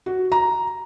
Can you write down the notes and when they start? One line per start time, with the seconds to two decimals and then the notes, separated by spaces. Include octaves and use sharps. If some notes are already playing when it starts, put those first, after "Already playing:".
0.06 F#4
0.32 A#5